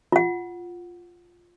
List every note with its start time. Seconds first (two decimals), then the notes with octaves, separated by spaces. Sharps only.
0.12 F4 F#5